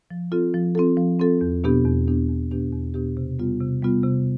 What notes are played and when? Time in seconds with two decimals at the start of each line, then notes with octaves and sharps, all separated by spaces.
0.10 F3
0.32 C4 F4 A4
0.54 F3
0.75 C4 F4 A4
0.97 F3
1.20 C4 F4 A4
1.41 E2
1.64 B2 B3 D4 G4
1.85 E2
2.07 B2 B3 D4 G4
2.29 E2
2.51 B2 B3 D4 G4
2.73 E2
2.94 B2 B3 D4 G4
3.17 C3
3.39 G3 B3 F4
3.61 C3
3.83 G3 B3 F4
4.04 C3